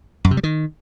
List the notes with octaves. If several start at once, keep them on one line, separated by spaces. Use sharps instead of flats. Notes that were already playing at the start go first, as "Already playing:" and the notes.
F#2
C3
G3
D#3